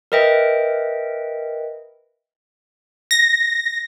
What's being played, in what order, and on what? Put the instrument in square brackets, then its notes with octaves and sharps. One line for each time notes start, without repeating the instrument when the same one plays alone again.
[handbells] A#4 B4 D#5 E5 G5
[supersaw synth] A#6